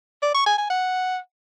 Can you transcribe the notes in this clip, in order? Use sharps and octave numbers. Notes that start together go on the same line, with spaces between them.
D5
C#6
G#5
G#5
F#5